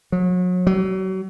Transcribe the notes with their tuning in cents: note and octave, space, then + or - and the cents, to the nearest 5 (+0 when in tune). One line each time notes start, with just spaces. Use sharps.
F#3 -35
F#3 +35